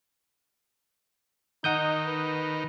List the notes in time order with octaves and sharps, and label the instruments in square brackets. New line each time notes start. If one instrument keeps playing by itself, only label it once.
[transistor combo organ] D#3 [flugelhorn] D#4 [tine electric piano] F#5 D#6 G6
[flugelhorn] B4